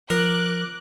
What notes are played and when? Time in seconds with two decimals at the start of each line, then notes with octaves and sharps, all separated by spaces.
0.10 F3 A#4 D6 F#6